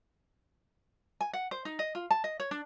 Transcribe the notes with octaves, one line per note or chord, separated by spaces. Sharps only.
G#5
F#5
C5
D#4
D#5
F4
A5
D#5
C#5
D4